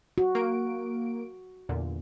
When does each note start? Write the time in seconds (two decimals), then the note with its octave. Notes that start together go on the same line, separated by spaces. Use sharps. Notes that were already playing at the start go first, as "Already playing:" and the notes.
0.18 F#4
0.35 A#3 D7
1.69 E2 A#2 D3